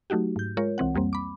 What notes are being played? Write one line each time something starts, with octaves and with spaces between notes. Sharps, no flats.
F#3 A3 D#4 F#4 G4
G#2 G6
G#3 F4 A#4 C#5
C2 E3 C4 F#5
F2 G3 A#3 C4
B5 D6